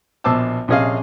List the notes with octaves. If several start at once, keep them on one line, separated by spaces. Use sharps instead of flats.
A#1 B2 C5 A5 D6 E6
A#1 C3 C#4 G#4 D#5 F5